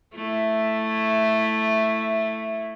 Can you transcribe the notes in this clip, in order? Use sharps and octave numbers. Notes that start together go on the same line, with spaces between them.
A3 E4